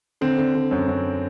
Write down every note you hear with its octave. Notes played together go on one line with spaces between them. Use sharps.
D3 C4
D3
D3
F#2
F#2